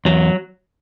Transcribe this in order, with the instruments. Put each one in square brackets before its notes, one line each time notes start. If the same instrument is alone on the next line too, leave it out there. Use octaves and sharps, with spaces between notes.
[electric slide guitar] E2 F#3